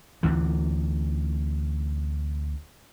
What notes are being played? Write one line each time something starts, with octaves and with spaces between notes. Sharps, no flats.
D2 C3 E3